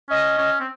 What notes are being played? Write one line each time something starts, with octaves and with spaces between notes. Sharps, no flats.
C#4 D#5
C#4
C4